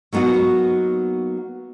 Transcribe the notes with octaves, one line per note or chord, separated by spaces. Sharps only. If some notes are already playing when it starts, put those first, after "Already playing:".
F#3 A#3 B3 D#4 F#4